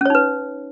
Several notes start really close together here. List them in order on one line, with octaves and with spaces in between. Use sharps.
C#4 C#5 D#4 B4